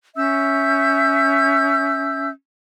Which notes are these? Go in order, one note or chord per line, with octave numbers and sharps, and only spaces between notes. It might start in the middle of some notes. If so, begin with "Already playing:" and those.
C#4 E5 E6 G6